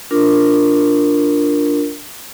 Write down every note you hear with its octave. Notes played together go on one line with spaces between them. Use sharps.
D4 F4 A#4